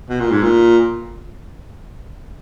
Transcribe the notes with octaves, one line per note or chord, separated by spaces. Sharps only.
B2
A#2
G#2
A#2